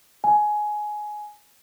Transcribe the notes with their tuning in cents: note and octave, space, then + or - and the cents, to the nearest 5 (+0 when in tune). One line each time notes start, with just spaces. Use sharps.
G#5 +15